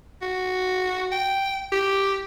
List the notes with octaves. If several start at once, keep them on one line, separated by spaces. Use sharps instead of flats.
F#4
G5
G4